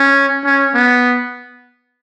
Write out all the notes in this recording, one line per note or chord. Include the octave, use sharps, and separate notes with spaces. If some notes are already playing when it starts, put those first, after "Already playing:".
Already playing: C#4
C#4
B3